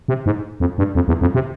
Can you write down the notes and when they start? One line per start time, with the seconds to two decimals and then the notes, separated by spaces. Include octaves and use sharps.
0.08 C3
0.26 G#2
0.60 F2
0.78 G2
0.95 F2
1.08 E2
1.21 F2
1.35 C3